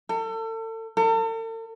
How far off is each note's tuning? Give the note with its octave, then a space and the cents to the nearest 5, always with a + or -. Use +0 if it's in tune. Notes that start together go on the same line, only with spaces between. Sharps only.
A4 +35
A4 +45